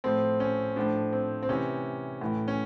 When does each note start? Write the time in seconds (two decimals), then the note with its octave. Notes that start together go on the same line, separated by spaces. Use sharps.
0.04 A2 F3 C4
0.40 C#4
0.76 A2 F3 D4
1.13 C4
1.43 C4
1.49 C3 E3 C#4
2.21 A2 E3
2.48 C#4